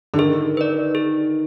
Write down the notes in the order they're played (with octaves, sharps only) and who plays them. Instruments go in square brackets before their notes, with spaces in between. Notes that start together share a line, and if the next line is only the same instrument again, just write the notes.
[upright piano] D3
[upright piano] D#3 [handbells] G#4
[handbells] B4 D5
G#4